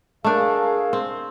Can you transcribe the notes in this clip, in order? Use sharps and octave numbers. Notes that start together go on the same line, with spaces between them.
A3 D4 G#4 A#4 F5
C4